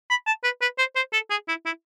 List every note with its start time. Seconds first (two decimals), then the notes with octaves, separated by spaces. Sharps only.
0.10 B5
0.27 A5
0.44 B4
0.62 B4
0.78 C5
0.96 C5
1.13 A4
1.30 G#4
1.48 E4
1.66 E4